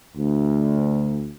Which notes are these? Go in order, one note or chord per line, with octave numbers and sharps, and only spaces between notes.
D2